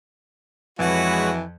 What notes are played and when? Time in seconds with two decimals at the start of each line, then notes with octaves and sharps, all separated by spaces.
0.79 F2 E3 G#3 F#4 B4 C#5